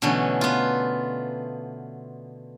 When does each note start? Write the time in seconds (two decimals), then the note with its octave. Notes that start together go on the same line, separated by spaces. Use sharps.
0.02 B2 D3 E3 A3 B3 C#4
0.41 B3 F4